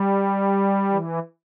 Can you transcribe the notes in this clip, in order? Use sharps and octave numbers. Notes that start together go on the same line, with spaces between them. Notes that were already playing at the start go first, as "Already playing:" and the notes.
Already playing: G3
E3